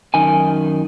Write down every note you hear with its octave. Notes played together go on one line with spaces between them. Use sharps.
F#2 D#3 G#5